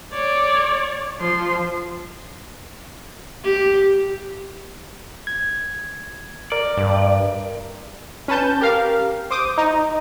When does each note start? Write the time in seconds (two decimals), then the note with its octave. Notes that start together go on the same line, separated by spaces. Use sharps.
0.13 C#5 D5
1.20 F3 C6
3.44 G4
5.27 G#6
6.52 A#4 D5
6.77 G2
8.28 C#4 B4 A5 G6
8.61 G4 A#4 F5
9.30 C5 D6 D#6
9.58 D#4